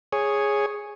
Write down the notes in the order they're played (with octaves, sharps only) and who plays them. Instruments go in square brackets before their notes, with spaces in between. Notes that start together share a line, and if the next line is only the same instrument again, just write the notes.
[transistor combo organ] G#4 C#5